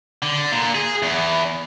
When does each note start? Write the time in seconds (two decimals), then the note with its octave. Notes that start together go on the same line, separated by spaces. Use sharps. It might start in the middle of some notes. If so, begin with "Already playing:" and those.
0.23 D3
0.52 A#2
0.75 G#4
1.02 E2